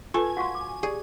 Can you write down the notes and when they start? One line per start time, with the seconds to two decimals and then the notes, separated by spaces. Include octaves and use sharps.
0.14 F4 A4 B4 G#5
0.37 F#4 F5 F#5 C6 C#6
0.55 D6
0.83 G4 G#4 D5